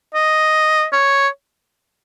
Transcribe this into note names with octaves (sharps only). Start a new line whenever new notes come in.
D#5
C#5